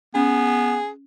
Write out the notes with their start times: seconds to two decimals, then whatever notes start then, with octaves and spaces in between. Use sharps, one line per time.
0.15 B3 C#4 G#4